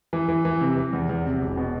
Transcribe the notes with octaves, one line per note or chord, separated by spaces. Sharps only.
E3
E3
E3
C3
E3
E2
E2
C3
E1
B2